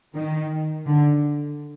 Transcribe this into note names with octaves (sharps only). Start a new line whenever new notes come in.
D#3
D3